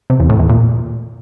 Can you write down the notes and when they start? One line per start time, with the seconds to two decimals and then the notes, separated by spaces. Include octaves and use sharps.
0.10 C3
0.20 E2
0.29 A2
0.39 E2
0.49 A#2